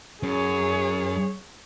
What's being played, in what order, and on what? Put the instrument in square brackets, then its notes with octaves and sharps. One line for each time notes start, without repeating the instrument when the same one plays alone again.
[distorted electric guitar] F#2 [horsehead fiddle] G#4 C#5